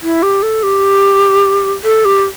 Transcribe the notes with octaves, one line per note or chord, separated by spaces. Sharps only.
E4
G4
A4
G4
A4
G4